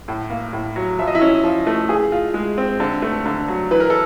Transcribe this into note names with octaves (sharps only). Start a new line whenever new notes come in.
A2
A#3
A2
F#3
F3 E5
D#5
E4 E5
C#4
F3
A3
G#4
F4
G#3
C4
D3
A3
D3
F#3
E3 B4
A#4
A4